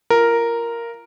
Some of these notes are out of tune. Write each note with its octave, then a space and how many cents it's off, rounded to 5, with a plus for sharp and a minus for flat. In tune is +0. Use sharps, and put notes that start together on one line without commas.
F4 -30 A#4 +0